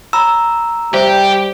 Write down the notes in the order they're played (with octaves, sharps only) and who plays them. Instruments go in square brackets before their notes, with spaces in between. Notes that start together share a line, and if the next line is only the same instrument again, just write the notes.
[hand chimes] A#5 E6 [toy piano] B5
[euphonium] G3 [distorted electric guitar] G4 [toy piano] C5 E5